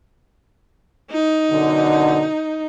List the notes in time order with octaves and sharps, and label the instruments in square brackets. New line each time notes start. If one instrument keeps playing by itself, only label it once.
[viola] D#4
[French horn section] F#2 B2 D3